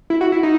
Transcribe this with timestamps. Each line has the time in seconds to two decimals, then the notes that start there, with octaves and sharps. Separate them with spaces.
0.10 E4
0.21 F#4
0.32 E4
0.43 D#4